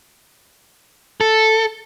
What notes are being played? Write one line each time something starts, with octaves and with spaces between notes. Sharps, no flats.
A4